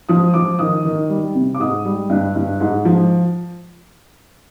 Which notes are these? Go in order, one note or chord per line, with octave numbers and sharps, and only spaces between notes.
F3 D#6
F3 D6
D#3 D#6
D#3
G3
C3
D6
G#2 D#6
G3
G2
G2
G#2
F3